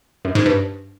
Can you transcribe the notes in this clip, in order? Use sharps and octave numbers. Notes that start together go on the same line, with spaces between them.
F#2
G#2
G2